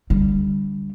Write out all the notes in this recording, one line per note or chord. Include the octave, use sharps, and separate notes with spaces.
D3 G3